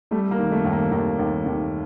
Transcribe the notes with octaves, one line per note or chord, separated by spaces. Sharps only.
G3 A3
A#3
D#3
A3
D#2
A#3
D#2 A#3
D#2
D#2